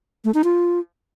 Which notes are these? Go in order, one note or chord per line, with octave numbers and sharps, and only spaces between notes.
A3
D#4
F4